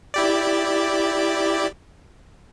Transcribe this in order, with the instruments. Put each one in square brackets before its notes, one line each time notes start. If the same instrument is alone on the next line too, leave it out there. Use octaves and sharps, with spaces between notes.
[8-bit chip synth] E4 G4 D5